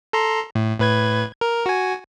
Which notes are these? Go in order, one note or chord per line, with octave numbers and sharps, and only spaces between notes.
A4 A#5 C6
A2
A2 B4 G#6
A#4
F#4 G#5